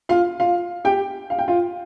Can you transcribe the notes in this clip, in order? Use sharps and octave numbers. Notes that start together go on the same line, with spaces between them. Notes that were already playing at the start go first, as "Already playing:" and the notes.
F4 F5
F4 F5
G4 G5
F5
G5
F4 F5